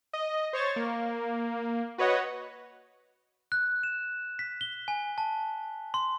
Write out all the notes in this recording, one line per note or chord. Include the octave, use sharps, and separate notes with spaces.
D#5
C5 C#5 C#6 A6
A#3
F#4 B4 C#5 D#5 F#5
F#6
E7
B6
G7
G#5
A5
C6